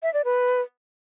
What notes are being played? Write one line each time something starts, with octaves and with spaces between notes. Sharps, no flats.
E5
D5
B4